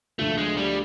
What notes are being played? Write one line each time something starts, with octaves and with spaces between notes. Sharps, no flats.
D2 D3 F3 A3
G#3
G3